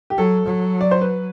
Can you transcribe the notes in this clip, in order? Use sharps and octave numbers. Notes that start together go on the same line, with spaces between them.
G4
F#3 A4
F#3
D5
C5
B4